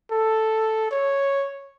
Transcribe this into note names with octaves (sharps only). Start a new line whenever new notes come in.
A4
C#5